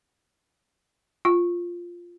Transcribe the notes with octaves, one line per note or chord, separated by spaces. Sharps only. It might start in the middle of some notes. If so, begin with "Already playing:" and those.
F4